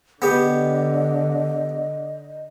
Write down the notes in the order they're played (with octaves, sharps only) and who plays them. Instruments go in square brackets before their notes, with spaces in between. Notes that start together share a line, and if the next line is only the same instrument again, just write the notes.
[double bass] D3 [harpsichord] B3 G4 [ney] D#5